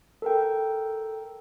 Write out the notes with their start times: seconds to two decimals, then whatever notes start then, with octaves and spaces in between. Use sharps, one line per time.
0.22 A4 A#4 G5